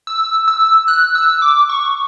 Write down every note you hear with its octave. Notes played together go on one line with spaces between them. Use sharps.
E6
E6
F#6
E6
D6
C#6